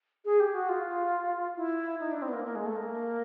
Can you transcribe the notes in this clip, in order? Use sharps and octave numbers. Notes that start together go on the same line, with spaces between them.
G#4
G4
F#4
F4
E4
D#4
D4
C4
B3
A#3
A#3
G#3
A3
A#3